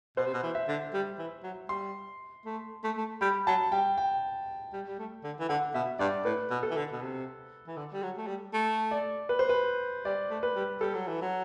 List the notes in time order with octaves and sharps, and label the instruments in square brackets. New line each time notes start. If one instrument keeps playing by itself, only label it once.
[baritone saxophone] B2 [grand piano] C5
[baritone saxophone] C3
B2
E3
[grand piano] E5
[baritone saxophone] D3
G3
E3
F#3
[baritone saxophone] G3 [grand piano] C6
[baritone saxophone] A3
A3
A3
[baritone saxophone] G3 [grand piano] B5
[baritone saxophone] F#3 [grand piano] A5
[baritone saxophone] G3 [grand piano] G5
[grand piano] G5
[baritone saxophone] G3
G3
A3
D3
E3
[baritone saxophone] D3 [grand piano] F#5
[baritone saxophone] B2 [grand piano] E5
[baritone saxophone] G2 [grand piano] D5
[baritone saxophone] A2 [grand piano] B4
[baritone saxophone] B2
[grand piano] A4
[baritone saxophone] E3
D3
B2
C3
E3
D3
G3
F#3
A3
G3
A3
[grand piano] D5
B4
C5
B4
[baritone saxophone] G3 [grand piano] D5
[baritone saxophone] A3
[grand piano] B4
[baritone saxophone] G3
[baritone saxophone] G3 [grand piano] A4
[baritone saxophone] F#3
E3
F#3